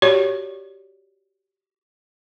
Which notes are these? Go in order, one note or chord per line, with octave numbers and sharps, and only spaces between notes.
F#4 G4 C#5 D5